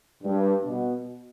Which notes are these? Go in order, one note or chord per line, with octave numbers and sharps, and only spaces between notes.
G2
B2